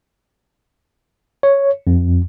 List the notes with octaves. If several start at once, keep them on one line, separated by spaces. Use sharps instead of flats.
C#5
F2